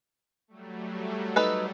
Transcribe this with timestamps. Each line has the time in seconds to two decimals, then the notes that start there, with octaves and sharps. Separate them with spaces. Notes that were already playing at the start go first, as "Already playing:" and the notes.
0.48 F#3 G3 A3
1.36 D#4 A4 B4